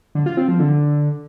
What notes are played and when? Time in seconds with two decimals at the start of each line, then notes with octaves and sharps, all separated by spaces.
0.15 D3
0.26 F4
0.37 C4
0.48 F3
0.59 D3